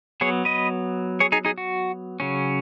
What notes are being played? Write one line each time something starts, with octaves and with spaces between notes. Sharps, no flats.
F#3 B3 G#4 C#5
B4 D#5
G#4 C#5
D#4 G#4
D#4 G#4
F#4
C#3 F#3 C#4